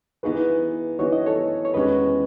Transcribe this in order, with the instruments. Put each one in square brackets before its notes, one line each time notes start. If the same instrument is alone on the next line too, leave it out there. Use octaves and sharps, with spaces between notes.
[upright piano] E3 B3 D#4 F#4 [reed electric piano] G#4 B4
[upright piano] E3 B3 D#4 F#4 [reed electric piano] C#5
[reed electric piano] D#5
A4 C#5
C#5
[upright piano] E2 D#3 G#3 C#4 F#4 [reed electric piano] B4 D#5